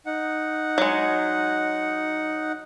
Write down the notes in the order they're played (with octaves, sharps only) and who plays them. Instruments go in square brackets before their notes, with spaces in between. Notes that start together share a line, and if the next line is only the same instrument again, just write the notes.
[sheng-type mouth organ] D#4 F#5
[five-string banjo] F#3 G#3